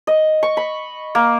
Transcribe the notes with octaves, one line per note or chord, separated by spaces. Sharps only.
D#5
C#6
B5
A#3